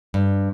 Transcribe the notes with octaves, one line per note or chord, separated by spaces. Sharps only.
G2